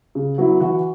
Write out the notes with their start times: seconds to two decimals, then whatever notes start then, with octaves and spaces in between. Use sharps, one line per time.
0.15 C#3
0.38 F#3 B3 E4
0.60 E3 F#4 F#5